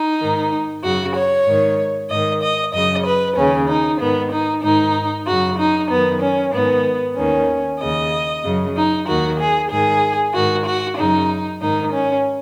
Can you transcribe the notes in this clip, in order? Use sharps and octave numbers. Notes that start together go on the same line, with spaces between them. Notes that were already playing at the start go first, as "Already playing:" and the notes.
Already playing: D#4
G#2 D#3
F#2 C#3 F#4
C#5
G#2 D#3
G#2 D#3 D#5
D#5
F#2 C#3 D#5
B4
D#2 C#3 C#4
D#4
G#2 D#3 B3
D#4
G#2 D#3 D#4
F#2 C#3 F#4
D#4
F#2 D#3 B3
C#4
G#2 D#3 B3
D#2 D#3 C#4
D#2 C#3 D#5
F#2 C#3
D#4
D#2 D#3 F#4
G#4
G#2 D#3 G#4
G#2 D#3 F#4
F#4
F#2 C#3 D#4
G#2 D#3 D#4
C#4